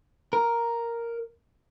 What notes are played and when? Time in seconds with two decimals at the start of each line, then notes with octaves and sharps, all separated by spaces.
0.33 A#4